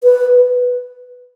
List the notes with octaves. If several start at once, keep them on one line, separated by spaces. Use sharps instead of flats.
B4